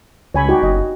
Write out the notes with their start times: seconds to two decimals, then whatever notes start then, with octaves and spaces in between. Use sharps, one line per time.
0.34 C#2 C#5 G#5 B5
0.48 D#4 F#4 G4
0.63 F#1 D#5